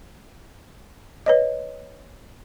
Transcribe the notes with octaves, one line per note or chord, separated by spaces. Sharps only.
B4 C#5 D#5